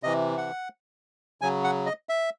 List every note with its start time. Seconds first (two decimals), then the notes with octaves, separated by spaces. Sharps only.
0.03 C3 E3 D#5
0.38 F#5
1.41 C#3 F#3 G#5
1.64 F#5
1.86 D#5
2.09 E5